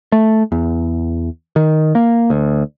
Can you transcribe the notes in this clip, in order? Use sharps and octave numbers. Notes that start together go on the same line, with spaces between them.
A3
E2
D#3
A#3
D2